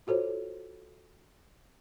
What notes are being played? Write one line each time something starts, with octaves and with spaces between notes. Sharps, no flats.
F4 F#4 A4 C5 C#5